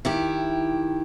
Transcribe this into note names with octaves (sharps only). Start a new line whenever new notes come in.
D#3 E4 G4